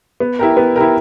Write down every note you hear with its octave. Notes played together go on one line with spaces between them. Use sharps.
B3
E4 G4 A#4
B3
E4 G4 A#4